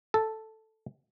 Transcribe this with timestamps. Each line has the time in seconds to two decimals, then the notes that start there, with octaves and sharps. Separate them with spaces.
0.14 A4